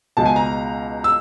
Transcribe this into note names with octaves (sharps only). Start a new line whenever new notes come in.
C#2 B2 G#3 A5
G#5
A#5
E6